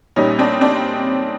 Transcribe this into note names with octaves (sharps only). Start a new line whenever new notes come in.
A#1 A#2 G3 C#4 D#4
C4 D4
C4 D4